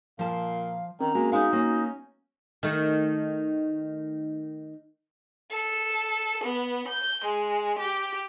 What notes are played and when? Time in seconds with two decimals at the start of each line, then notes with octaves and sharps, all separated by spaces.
0.19 A#2 F3 F5 A5
1.00 D#3 C4 C#4 A#4 A#5
1.15 G#3 A#3 F#4
1.32 G#3 B3 D#4 C5 F5
1.53 A#3 C#4
2.63 D#3 A3
5.51 A4
6.44 B3
6.87 G6
7.25 G#3
7.79 G4